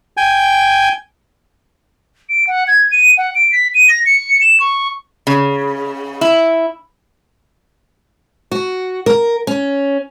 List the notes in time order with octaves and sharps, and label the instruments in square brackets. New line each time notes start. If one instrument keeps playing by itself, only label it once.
[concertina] G5 G#5
[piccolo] D7
F#5
G#6
D#7
F#5
D7
B6
D#7
A#6
C#7
E7
C#6
[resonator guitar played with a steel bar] C#3
E4
[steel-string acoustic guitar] F#4
A#4
C#4